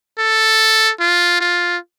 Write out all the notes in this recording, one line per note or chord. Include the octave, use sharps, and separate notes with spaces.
A4
F4
F4